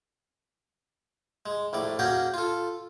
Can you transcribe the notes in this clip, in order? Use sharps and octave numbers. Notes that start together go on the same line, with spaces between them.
G#3
A#1 A2 D5
A#3 C#4 F#4 G#4 G5
F4 A4